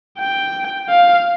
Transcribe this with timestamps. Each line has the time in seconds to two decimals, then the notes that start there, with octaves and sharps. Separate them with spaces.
0.19 G5
0.89 F5